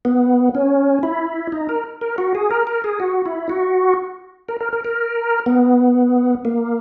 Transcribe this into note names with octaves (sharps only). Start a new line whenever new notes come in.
B3
C#4
E4
D#4
A#4
A#4
F#4
G#4
A#4
A#4
G#4
F#4
E4
F#4
A#4
A#4
A#4
A#4
B3
A#3